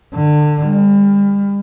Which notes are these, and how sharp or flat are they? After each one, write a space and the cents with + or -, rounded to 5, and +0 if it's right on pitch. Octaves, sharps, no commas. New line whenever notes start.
D3 +25
G3 +40